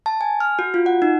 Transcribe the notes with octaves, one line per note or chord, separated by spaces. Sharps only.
A5
G#5
F6
F#4
F4
F#5
D#4